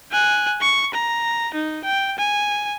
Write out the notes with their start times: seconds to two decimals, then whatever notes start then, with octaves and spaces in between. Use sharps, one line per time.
0.11 G#5 F#6
0.61 C#6
0.94 A#5
1.54 D#4
1.84 G5
2.19 G#5